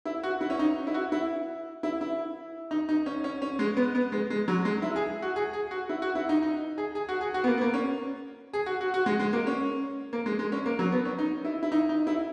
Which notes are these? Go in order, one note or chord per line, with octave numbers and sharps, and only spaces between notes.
E4
F#4
E4
C#4
D#4
E4
F#4
E4
E4
E4
D#4
D#4
C#4
C#4
C#4
G#3
B3
B3
G#3
G#3
F#3
G#3
E4
G#4
F#4
G#4
G#4
F#4
E4
F#4
E4
D#4
D#4
G#4
G#4
F#4
G#4
F#4
B3
A#3
B3
A#3
C#4
G#4
F#4
F#4
F#4
G#3
G#3
A#3
C#4
A#3
G#3
G#3
C#4
A#3
F#3
B3
C#4
D#4
E4
E4
D#4
D#4
E4